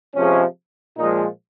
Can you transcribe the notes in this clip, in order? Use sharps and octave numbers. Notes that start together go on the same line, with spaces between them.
C3 F3 G#3 C#4
A#2 F3 G#3 D#4